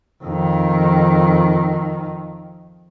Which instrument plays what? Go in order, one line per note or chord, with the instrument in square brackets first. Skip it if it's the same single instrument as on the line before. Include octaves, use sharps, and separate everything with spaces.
[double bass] F2 D#3